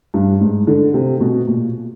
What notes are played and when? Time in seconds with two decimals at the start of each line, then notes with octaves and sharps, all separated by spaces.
0.14 G2
0.40 G#2
0.67 D3
0.94 C3
1.20 B2
1.47 A#2